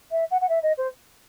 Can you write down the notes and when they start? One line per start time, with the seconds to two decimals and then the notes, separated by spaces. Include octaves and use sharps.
0.11 E5
0.31 F#5
0.41 F#5
0.49 E5
0.62 D#5
0.77 C5